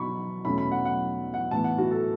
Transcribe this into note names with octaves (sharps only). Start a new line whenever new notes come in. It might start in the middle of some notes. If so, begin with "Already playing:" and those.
Already playing: B2 F#3 B5 C#6
E2 B2 A3 C#4 B5
B5
F#5
F#5
F#5
A2 E3 B3 A5
F#5
F#4
A4